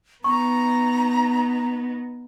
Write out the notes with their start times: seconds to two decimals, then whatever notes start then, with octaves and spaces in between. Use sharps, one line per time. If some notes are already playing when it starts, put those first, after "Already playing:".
0.24 B3 D#4 A#5 C#6